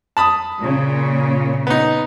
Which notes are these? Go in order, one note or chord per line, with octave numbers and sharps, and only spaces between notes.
A5 B5 D#6
A#2 C#3
B3 D#4